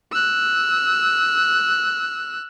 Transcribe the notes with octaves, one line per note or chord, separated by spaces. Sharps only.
E6 F#6